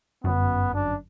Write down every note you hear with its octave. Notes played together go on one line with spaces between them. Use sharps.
G1 F#2 B3
D4